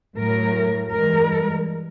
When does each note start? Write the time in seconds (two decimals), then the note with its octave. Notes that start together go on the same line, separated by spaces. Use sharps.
0.16 A2 F#3 A3 A#4
0.92 G2 E3 G#3 A#4